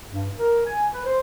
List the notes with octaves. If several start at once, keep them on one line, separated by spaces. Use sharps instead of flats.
G2
A#4
G#5
B4
C5